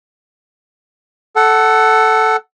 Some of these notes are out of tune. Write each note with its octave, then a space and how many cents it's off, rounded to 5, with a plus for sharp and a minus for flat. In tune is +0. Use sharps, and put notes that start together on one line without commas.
A4 +0 F#5 +15